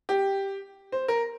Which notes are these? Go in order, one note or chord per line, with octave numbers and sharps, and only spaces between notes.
G4
C5
A#4